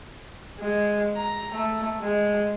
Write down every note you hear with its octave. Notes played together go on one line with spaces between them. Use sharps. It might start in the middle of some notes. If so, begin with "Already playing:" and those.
G#3
A#5
A3
G#3